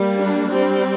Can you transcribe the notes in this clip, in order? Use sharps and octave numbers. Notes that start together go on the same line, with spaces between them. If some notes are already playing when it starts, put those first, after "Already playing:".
Already playing: G3 A#3
D4
G3 C4